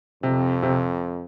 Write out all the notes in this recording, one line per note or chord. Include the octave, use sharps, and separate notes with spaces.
F2 C3
C3